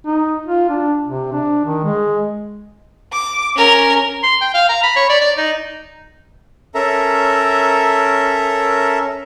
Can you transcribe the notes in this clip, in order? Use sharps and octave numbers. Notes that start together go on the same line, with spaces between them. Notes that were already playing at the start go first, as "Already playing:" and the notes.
D#4
F4
D4
C3
D4
D#3
G#3
D6
C#4 A#4
C6
G5
F5
A#5
B5
C#5
D5
D5
D#4
C#4 A4 A#4 E5 A#5